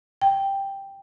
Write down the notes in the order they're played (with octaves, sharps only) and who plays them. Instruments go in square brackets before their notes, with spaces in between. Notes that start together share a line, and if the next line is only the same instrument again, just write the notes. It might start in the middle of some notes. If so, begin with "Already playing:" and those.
[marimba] G5